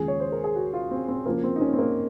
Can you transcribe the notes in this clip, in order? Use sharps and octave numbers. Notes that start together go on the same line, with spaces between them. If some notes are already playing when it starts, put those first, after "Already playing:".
Already playing: D#2 C#3 F3 G#3 G#4
C#5
C5
A#4
G#4
F#4
F4
C4
C4
F2 C#3 F3 A#3
C4
D#4
C#4
C4
A#3